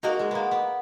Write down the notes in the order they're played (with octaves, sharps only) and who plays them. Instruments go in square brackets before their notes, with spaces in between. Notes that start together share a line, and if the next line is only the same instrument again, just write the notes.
[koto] A#3 [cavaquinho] D#4 F#4 A#4
[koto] G#3
A#3 B3
B3